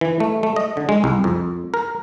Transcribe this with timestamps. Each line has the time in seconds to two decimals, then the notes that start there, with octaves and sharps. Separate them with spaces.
0.01 E3
0.20 A3
0.43 A3
0.56 D#5
0.77 D3
0.89 G#3
1.04 C2
1.24 F2
1.74 A#4